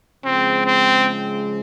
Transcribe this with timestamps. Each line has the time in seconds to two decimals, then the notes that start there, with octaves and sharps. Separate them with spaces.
0.24 C#3 F3 G#3 C4
0.66 C4